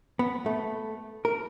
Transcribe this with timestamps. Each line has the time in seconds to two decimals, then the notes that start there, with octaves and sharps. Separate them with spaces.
0.19 B3
0.46 A3
1.25 A#4